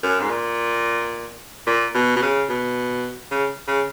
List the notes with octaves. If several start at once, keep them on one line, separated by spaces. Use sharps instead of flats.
F#2
G#2
A#2
A#2
B2
B2
C#3
B2
C#3
C#3